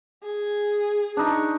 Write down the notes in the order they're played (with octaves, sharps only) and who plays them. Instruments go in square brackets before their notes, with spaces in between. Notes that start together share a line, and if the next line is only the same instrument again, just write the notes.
[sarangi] G#4
[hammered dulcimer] D4 D#4 C#6